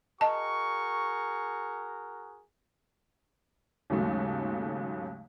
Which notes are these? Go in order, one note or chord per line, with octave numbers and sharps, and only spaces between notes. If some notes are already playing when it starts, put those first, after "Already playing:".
F#4 G#4 A#4 D#5 A5 C#6
D#2 G#2 C#3 F#3 A3